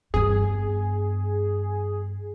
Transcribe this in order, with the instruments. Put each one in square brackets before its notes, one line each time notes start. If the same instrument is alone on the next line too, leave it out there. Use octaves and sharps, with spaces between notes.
[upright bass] G2 B3 [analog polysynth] G#4